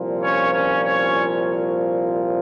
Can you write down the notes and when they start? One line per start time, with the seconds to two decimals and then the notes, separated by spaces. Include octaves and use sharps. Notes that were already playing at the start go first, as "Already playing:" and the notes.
Already playing: C2 A#2 F3
0.22 C#4 C#5
0.52 C#4 C#5
0.81 C#4 C#5